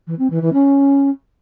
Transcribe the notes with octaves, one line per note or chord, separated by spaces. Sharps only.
E3
C4
E3
E3
C#4